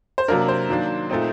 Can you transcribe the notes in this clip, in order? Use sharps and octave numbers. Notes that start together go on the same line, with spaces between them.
C5
C3 F#3 A#3 D4 A#4
C5
D#3 F#3 A#3 D4
A#2 A3 C4 D#4